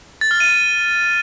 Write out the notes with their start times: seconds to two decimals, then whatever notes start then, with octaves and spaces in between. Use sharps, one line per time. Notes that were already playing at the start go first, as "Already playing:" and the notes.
0.21 A6
0.31 F6
0.40 D#7